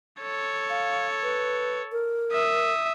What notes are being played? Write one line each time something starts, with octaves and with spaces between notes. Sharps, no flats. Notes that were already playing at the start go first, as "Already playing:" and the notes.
A4 C#5
F5
B4
A#4
E5 D#6